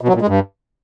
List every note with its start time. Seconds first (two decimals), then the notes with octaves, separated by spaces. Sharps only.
0.01 B2
0.08 F#3
0.15 A#2
0.21 G#3
0.28 G2